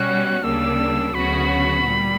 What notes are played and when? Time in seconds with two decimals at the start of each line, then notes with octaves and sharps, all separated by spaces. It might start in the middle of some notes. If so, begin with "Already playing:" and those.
Already playing: B2 G3 C#4 F#4 F#6
0.43 D2 C#3 G3 A#3 D4 E6
1.14 D2 C#3 F#3 B3 F#4 B5
1.85 A#2 G3